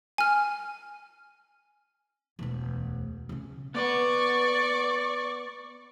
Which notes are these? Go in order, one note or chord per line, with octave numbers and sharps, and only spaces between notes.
G#5 F6
E1 D2
C#3 C#4
B3 B4 D5 C#6